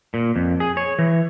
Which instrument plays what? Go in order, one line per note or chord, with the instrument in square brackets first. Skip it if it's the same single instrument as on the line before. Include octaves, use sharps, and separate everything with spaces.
[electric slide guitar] A#2
F2
G#4
C#5
E3